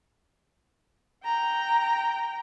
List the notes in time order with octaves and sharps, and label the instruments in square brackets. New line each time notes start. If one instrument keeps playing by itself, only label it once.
[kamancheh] G5 A#5